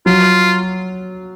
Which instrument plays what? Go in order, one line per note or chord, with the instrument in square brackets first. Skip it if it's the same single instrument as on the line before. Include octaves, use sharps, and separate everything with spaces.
[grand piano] F#3 [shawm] F4